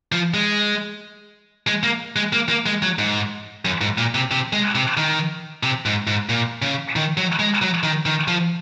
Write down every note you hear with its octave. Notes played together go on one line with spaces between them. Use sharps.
F3
G#3
G#3
A#3
G#3
A#3
A#3
G#3
F#3
G#2
F#2
G#2
A#2
C3
C3
G#3
C3
D#3
C3
G#2
G#2
A#2
C#3
D#3
F#3
G#3
F#3
D#3
D#3
F3